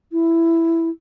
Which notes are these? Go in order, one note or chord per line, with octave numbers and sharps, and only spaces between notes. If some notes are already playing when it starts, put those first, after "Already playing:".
E4